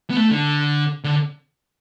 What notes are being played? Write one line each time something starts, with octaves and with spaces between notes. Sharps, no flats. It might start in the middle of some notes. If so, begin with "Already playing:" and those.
B3
A3
D3
D3